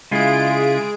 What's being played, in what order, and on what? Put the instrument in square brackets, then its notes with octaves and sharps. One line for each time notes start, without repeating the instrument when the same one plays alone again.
[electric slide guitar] C#3 E4 F4 [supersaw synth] G#3 G#4 D7